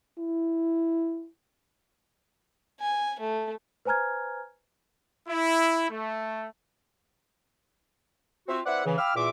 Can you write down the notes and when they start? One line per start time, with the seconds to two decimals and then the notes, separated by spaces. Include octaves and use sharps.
0.18 E4
2.80 G#5
3.20 A3
3.85 B4 C5 G#5 A#5 F6 G#6
5.28 E4
5.90 A3
8.48 C4 F4 F#4 E5
8.66 C4 E4 B4 D5 E5 F#5
8.85 C#3 E3
8.98 F5 G5 B5 D6 E6 F6
9.15 E2 A#2 E5 D6